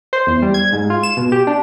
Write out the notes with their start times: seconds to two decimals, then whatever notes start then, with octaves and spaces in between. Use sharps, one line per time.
0.13 C5
0.27 E2
0.42 G3
0.54 G#6
0.73 G#2
0.90 F4
1.03 E7
1.17 B2
1.32 G4
1.47 D4